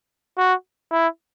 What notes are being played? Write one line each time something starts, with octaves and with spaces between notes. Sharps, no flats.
F#4
E4